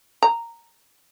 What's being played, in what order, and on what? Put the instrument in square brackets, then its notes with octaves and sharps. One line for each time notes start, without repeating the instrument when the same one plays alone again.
[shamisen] A#5